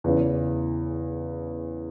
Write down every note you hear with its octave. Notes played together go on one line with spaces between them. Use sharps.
E2 C#3 E3